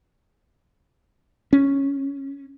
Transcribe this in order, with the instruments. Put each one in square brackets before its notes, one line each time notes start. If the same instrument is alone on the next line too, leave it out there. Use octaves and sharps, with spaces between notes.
[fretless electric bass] C#4